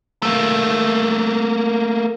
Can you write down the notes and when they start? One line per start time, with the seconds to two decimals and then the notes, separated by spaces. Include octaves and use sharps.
0.23 A3 A#3